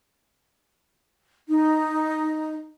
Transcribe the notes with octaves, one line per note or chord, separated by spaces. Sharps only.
D#4